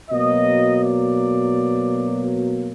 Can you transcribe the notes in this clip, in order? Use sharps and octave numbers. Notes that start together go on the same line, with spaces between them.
B2 F#3 A#3 D#5
D5